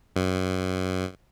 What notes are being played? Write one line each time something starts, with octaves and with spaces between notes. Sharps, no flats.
F#2